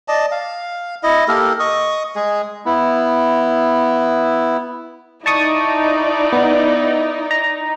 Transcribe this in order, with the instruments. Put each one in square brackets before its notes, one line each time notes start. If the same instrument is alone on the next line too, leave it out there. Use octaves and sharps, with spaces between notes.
[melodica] D5 D#5 A5
F5
E4 D#5
A#3 G4 A4 A#4
D#5 C#6 D#6
G#3 G#4
[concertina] B3 E4
[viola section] D#4 [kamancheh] E4 D5 [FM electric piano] A5 C#6 D#6
[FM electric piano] B3
A#5